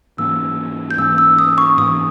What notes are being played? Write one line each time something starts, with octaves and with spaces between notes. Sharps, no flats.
G#2 E3 A#3 C#4 E6
G6
G#2 E3 A#3 C#4 E6
E6
D#6
C#6
G#2 E3 A#3 C#4 D#6